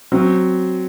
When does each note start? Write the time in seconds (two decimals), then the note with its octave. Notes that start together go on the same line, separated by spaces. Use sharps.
0.12 F#3 C4